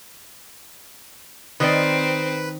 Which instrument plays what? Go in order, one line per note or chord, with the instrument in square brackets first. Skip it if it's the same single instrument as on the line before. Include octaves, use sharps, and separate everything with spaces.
[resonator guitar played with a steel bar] D#3 C5 D5 [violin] C4 [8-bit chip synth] B4